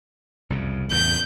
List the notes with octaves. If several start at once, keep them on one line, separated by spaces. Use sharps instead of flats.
C2 F2 C#3
E2 A2 C#3 G6